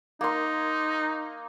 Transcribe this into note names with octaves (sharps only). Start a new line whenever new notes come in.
A#3 D#4 C6